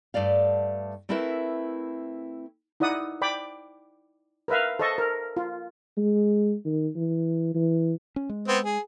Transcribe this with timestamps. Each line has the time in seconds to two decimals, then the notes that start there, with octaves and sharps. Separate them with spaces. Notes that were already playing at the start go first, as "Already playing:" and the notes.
0.14 G2 A3 D5 F5
1.09 A3 C4 E4 A#4 B4 E5
2.80 D#4 E4 D5 F#5 D#6
3.21 D5 G5 B5 D6
4.48 A#4 B4 E5 F5
4.79 A4 C5 D#5 A5 C#6
4.98 A#4
5.37 F4
5.97 G#3
6.65 D#3
6.96 E3
7.54 E3
8.16 C#4
8.29 G#3
8.48 B3 C4
8.64 G#4